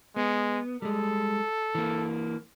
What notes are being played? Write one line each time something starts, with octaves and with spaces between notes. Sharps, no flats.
G#3 B3
G3 G#3 A4
E3 A#3